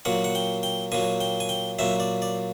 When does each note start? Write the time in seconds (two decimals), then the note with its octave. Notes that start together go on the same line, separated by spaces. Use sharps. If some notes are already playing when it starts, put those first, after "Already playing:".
0.05 A#2 F#3 F#5
0.24 F#5
0.35 G5
0.63 G5
0.92 A#2 F#3 G#5
1.21 G5
1.40 G#5
1.49 G5
1.79 A#2 F#3 E5
2.00 D5
2.22 D5